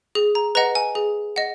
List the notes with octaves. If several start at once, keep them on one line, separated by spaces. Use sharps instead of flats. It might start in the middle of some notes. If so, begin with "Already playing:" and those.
G#4
A#5
B4 D#5 F#5 A#5
G#5
G#4
D#5 F#5